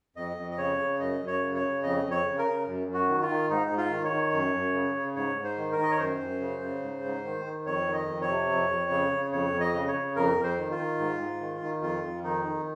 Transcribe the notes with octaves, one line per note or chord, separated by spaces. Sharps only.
F2 D#5
F2
D#5
C#3 C#5
C#3
F#2 D#5
F#2
C#5
C#3
C#5
C#3
F2 D#5
F2
C#5
C#3
A#4
C#3
F#2
F#2
F#4
D#3
F4
D#3
G#2 D#4
G#2
F4
D#3
C#5
D#3
F#2
F#2
C#3
C#3
G#2 C#5
G#2
C5
D#3
A#4
D#3 D#5
C#5
F#2 C5
F#2
C#3
C#3
G#2
G#2
D#3
D#3
F2 C#5
D#3
D#5
F2
C#5
C3
F2
F2
C#3
C#3
F2 C#5
F2
D#5
C#3
C#5
C#3
F2 A#4
F2
C5
D#3
F4
D#3
G#2
G#2
D#3
D#3
F2 F4
F2
D#3 D#4
D#3